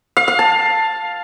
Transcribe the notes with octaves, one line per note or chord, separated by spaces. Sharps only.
F5
F5
A5